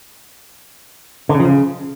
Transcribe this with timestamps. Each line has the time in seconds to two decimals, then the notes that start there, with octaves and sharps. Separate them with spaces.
1.29 D3
1.35 C#3
1.40 F3
1.45 C#3